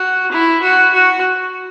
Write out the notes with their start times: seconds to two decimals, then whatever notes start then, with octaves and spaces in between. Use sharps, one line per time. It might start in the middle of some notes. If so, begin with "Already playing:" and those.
Already playing: F#4
0.32 E4
0.63 F#4
0.94 F#4